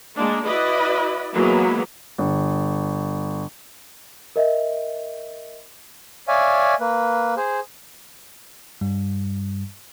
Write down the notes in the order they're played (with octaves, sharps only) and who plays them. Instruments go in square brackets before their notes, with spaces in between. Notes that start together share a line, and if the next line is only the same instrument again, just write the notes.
[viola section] G#3 A#3 D4
E4 F#4 B4 D5 D#5
E3 F#3 G#3 A#3 B3
[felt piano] G1
[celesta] A#4 D#5 E5
[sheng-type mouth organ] C#5 D5 E5 F5 G#5
A#3 B4
G#4 C5
[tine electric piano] G2 G3